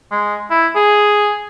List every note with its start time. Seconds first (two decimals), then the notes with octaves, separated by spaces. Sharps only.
0.12 G#3
0.51 E4
0.75 G#4